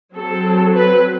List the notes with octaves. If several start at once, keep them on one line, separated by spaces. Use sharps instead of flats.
F#3 C4 A4
B4